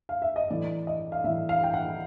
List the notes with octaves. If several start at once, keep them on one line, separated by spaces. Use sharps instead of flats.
F5
E5
D#5
A2 E3 D5
D#5
F5
A2 E3 E5
F5
G5
F#5